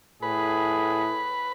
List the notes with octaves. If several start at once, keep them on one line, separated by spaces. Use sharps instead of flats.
A2 G#4 B4